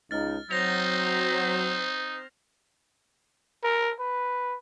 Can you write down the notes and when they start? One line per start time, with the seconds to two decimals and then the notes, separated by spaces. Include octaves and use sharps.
0.11 C#2 D#4 F6 A6
0.51 F#3 C4 D#4 C5 A#6 F7
3.64 A#4
4.00 B4